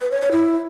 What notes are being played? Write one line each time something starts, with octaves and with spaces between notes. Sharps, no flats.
B4
C#5
C#5
E4